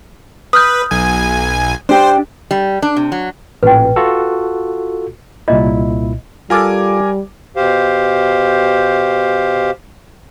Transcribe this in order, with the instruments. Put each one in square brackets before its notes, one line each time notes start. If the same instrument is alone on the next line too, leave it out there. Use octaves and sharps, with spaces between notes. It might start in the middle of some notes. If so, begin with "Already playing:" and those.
[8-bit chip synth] B4 [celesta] D#6 F6 G6
[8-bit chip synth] B1 G#5
[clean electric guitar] D4 G4 [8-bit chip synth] C5
[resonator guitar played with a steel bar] G3
D4
C3
F#3
[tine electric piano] A1 A#2 E3 [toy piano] B4 G5
[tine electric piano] F4 F#4 A4
[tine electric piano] C2 A#2 E4 [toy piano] D#5
[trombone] G3 [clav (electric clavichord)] F4 A4 [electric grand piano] A#4 G#5 D6
[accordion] B2 G4 C5 F5